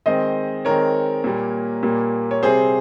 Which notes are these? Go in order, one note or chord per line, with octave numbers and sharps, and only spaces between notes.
D#3 G#3 C4 C5 D#5
D#3 G#3 C4 A#4 C#5
A#2 G3 A#3
A#2 G3 A#3
C#5
C3 G3 C4 G#4 C5